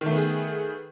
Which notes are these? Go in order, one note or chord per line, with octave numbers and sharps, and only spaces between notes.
D#3 A3 B3 G#4